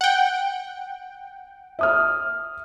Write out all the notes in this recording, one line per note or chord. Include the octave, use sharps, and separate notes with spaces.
F#5 G5
E5 D#6 F6